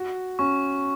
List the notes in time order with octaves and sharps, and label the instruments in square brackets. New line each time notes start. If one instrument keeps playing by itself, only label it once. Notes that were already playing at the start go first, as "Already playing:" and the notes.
Already playing: [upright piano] F#4
[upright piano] C#4 [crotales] C#6